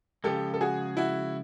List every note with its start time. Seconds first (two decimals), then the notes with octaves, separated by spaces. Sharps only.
0.24 C#3 F3 G#3 G4 A4
0.54 A4
0.61 F#4 G#4
0.97 E4 F#4